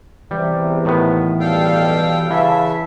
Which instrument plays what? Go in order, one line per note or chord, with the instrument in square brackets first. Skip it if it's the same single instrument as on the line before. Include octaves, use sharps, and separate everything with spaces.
[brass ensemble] E2 C3 [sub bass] E3 [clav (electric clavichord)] G3
[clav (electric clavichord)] A2 D#3 B3
[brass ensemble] B1 G3 [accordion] A4 F5 G5
[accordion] C#3 E5 [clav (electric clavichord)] E3 [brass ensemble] F5 A5